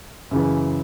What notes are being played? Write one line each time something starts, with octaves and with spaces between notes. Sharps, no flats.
F#2 C#3 E3